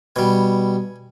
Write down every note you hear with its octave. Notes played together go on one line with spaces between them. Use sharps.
B2 G3 G#5